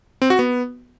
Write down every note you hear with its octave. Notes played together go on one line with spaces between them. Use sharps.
C4
F#4
B3